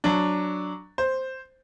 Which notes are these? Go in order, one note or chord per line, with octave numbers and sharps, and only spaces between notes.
F#3 D4
C5